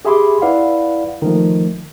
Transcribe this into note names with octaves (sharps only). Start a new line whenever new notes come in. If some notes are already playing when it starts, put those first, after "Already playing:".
G4 G#4 E5 B5 C6 D6
E4 B4 D5 F5 F#5
D#3 F3 A3